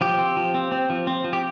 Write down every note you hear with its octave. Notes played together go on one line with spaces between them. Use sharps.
F3 G4
C4
F3
C4
C4
F3
C4
F3
G4